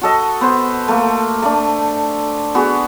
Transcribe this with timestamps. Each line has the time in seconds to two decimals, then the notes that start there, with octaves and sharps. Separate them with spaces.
0.02 F#4 A4 D#5
0.41 B3 C5
0.88 A3 A#3
1.42 A3 D4
2.55 B3 F#4 G#4